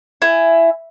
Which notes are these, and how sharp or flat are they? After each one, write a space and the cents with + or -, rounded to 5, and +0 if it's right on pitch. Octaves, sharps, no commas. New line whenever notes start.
E4 +15 G#5 +0